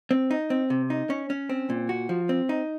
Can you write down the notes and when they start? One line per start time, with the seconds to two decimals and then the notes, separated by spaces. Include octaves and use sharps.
0.11 C4
0.31 D#4
0.50 C4
0.70 C3
0.90 D#4
1.10 C#4
1.30 C#4
1.49 C4
1.70 A#2
1.89 F#4
2.09 F3
2.29 C4
2.49 D#4